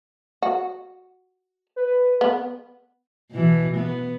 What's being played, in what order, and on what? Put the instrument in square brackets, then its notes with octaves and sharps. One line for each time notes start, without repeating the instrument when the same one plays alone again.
[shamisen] F#4
[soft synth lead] B4
[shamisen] B3
[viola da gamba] B2 E3
B3